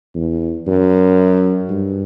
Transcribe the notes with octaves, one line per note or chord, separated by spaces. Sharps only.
E2
F#2
G2